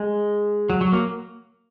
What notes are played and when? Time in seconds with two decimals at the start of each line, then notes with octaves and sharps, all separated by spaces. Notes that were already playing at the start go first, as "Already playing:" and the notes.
Already playing: G#3
0.70 F#3
0.81 F#3
0.92 A#3